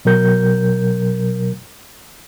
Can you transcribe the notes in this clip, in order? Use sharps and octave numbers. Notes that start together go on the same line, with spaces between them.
B2 F#3 A#4 G6